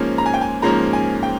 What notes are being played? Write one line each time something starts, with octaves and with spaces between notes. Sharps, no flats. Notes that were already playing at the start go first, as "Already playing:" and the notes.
Already playing: G#2 F3 A#3 C#4
A#5
G#5
G5
G#5
G#2 F3 A#3 C#4 A#5
G#5
G5